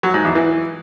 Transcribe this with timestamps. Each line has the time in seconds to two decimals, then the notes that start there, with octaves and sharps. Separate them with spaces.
0.03 F#3
0.14 G#2
0.25 E2
0.35 E3